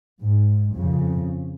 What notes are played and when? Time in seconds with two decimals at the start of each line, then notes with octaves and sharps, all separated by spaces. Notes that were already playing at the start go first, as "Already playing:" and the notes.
0.22 G#2
0.76 F2 C#3